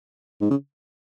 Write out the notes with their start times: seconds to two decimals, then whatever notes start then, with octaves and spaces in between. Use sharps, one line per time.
0.41 G#2
0.50 C#3